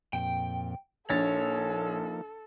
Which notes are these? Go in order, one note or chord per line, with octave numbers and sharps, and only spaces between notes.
F2 A#2 G5
A#1 F3 A#3 D#4 A4 C#5 A6